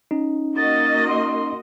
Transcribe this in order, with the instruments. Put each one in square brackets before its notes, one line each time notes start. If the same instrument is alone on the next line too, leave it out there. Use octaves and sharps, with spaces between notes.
[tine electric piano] C#4 D#4
[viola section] A#3 F#4 D#5 [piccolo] A6
[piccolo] C6